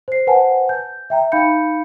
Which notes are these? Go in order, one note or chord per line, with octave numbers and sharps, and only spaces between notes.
C5 C7
B4 C5 F#5 G#5 A5
G6
E5 G5 A#5
D#4 F5 B5 G6 C#7